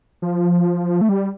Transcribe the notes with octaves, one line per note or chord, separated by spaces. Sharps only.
F3
A3
G3